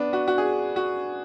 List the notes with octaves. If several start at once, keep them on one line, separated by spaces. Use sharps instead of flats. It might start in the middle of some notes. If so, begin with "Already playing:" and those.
Already playing: B3 D4
F#4
F#4
G#4
F#4